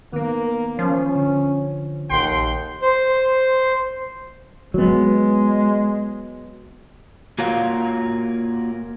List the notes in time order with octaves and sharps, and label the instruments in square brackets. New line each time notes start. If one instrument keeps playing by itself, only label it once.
[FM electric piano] D#3 B3 [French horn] A#3
[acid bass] F3 [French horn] C#4
[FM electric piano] D3
[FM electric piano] A#1 [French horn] D#2 [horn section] F#5 G5 C6
[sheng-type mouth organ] C5
[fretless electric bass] F#3 B3 [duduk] G#3
[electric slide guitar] A#3 F4 F#4 A#4 C#5 F5